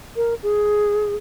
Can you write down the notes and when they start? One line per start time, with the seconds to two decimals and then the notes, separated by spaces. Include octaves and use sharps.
0.16 A#4
0.43 G#4